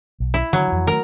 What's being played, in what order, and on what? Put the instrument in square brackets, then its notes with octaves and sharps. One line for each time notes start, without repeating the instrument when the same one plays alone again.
[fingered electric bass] B1
[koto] E4
[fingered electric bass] D3 D#3 [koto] F#3
[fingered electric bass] F2 E3
[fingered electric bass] D#3 A3 [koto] A#4